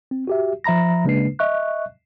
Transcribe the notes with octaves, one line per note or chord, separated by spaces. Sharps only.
C4
F#4 G4 E5
F3 E5 A#5 B5 A#6
C#3 G#3 A#3 D4 B4 C7
D#5 E5 C#6 F#6